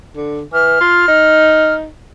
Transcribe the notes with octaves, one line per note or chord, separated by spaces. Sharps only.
D3
E3 F6
F4
D#4